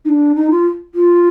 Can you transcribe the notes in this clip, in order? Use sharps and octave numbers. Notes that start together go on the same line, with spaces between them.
D#4
D4
D#4
F4
F4